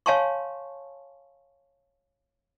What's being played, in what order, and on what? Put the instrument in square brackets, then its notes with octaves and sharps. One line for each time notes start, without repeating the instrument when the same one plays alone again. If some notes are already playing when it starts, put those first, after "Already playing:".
[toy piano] C#5 F5 G#5 A5 C6 C#6